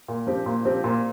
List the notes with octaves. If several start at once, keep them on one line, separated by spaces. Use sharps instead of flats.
A#2
F3 C4 G4
A#2
F3 C4 G4
A#2